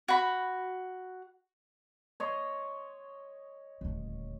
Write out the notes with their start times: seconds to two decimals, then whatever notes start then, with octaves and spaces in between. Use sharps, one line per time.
0.08 F#4 B5
2.20 C#5 D#5 C6
3.81 D#1 D2